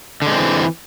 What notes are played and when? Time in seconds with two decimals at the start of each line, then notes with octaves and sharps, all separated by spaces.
0.22 D3
0.27 G#3
0.32 C4
0.37 E3